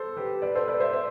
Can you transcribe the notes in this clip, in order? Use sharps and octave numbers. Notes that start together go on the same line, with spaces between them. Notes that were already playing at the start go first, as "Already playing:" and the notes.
Already playing: A4 C5
G4 B4
B4 D5
A4 C5
B4 D5
C5 E5
C5 E5